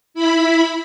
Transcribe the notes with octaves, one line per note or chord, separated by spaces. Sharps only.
E4 B5